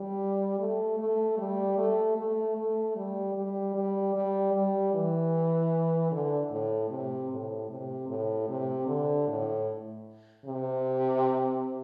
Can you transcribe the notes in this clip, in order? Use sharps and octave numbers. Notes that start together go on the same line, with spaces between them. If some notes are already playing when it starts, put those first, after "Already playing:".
Already playing: G3
A3
A3
G3
A3
A3
A3
G3
G3
G3
G3
G3
E3
D3
A2
C3
A2
C3
A2
C3
D3
A2
C3